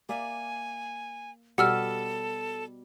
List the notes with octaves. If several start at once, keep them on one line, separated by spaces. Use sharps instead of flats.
A#3 D5 E5 G#5
B2 G3 A4 F#5 E6 F6